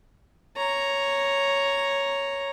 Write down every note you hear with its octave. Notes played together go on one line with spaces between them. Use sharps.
C#5 A#5